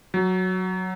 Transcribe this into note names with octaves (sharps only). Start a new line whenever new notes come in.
F#3